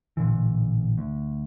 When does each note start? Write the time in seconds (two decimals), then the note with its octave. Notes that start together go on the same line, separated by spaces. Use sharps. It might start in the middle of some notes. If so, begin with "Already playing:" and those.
0.17 A1 A#2 D3 E3
0.98 D2